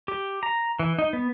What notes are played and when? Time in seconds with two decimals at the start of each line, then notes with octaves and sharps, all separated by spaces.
0.08 G4
0.43 A#5
0.79 E3
0.99 D#4
1.13 B3